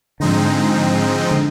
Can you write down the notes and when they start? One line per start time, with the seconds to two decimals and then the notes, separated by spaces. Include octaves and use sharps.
0.20 G#2 D3 F3 G#3 C4 D#4
1.31 D3